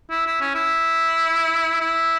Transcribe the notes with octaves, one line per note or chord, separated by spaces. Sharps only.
E4
E4
C#4
E4
E4